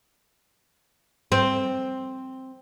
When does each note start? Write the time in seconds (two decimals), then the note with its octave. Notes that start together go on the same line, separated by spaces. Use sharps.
1.32 C4